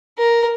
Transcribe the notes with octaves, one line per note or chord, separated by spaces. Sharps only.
A#4